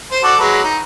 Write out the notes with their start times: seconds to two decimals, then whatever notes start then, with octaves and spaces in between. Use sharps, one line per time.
0.11 C5
0.23 F#4 A4 D5
0.40 F#3 G#3 B4
0.64 D#4